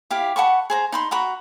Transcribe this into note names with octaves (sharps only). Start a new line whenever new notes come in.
E4 G4 F5
F#5 A5 B5 C#6
G#4 C5 A#5
D#4 B5 C6
F#4 A#5 B5 C#6